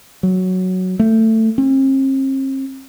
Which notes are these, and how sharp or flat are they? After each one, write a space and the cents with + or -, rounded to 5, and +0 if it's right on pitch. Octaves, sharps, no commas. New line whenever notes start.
F#3 +0
A3 +15
C4 +45